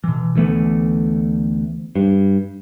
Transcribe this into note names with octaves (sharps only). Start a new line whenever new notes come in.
B2 E3
D2 E3 A3 B3
G2